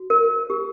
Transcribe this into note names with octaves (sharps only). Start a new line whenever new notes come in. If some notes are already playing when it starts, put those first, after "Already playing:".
Already playing: F#4
A#4
G4